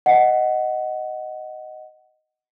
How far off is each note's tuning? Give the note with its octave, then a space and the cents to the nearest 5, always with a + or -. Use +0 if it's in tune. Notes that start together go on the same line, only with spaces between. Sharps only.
D#5 +0 F#5 +10